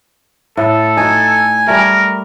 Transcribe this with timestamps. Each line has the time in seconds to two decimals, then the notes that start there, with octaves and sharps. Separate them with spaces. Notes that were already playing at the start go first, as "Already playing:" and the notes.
0.57 A2 B3 A4
0.97 D#4 F#4 G#5
1.67 G3 A3 A#4